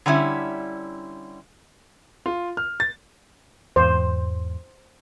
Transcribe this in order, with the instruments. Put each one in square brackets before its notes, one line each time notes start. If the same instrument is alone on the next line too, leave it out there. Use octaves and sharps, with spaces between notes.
[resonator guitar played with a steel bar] D3 G3 C#4 E4
[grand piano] F4
F6
A6
[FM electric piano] E2 G#2 [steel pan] C5